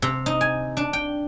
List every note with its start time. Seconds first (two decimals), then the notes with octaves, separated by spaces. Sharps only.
0.02 C3
0.26 D#4
0.41 G#5
0.77 D4
0.93 G5